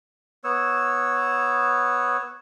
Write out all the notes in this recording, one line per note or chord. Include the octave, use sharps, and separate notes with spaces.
B3 C#5 E6